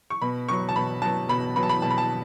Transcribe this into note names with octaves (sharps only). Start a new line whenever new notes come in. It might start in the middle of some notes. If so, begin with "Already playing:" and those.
C#6
B2 B5
F#3 B3 C#6
A5
B2 B5
F#3 B3 A5
B2 B5
F#3 B3 B5
A5
B5
B2 A5
B5
A5